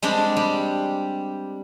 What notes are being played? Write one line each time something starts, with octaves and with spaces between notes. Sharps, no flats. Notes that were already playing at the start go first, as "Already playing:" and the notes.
G3 G#3 C4 D4
G3